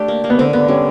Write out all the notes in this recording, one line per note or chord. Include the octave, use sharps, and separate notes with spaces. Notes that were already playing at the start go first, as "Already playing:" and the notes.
Already playing: A3 D4 G4
A#3
A#3
B3
D3 C4
D3 B3
G3 C#4